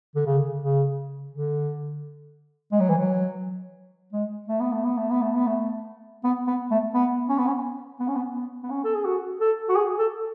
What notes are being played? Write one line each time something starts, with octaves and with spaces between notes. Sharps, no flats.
D3
C#3
C#3
D3
G#3
F#3
E3
F#3
G#3
A3
B3
A3
B3
A3
B3
A3
B3
A3
B3
B3
A3
B3
C#4
B3
C#4
B3
C#4
B3
B3
B3
C#4
A4
G#4
F#4
A4
F#4
G#4
A4